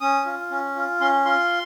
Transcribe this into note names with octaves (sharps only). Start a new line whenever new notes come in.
C#4 D#6
F4
C#4
F4
C#4 C6
F4 C6